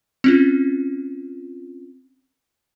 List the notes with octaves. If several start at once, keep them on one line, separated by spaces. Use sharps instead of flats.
C4 C#4 F4